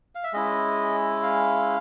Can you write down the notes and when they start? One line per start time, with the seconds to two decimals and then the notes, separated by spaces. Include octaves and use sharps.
0.15 F5
0.24 E5
0.33 G#3 C#4 E4 D#5
1.23 F5